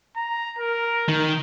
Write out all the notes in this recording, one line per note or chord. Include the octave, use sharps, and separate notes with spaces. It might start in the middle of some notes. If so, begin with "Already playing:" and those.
A#5
A#4
D#3